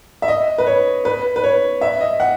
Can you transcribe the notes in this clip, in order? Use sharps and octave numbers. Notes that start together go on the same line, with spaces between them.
E5
D#5
B4
C#5
B4
B4
C#5
E5
D#5
F#5